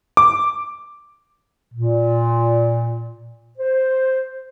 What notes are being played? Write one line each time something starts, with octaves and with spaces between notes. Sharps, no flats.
D6
A#2
C5